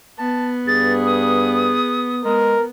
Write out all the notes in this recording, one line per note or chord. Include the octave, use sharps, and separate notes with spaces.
B3 A5
G2 G#4 A6
D#6
G#3 B3 A#4